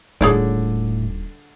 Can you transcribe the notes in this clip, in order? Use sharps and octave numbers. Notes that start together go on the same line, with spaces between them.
D#1 A2 D3 G#4 C#5 D5